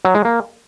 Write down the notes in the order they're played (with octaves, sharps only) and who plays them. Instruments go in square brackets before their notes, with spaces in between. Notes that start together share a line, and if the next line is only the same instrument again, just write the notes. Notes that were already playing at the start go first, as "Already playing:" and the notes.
[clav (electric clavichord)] F#3
G#3
A#3